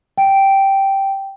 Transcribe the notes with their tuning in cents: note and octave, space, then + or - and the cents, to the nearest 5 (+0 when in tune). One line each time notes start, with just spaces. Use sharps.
G5 -5